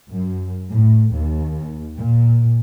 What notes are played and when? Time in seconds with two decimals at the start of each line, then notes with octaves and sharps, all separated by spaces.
0.11 F#2
0.72 A2
1.15 D#2
1.98 A#2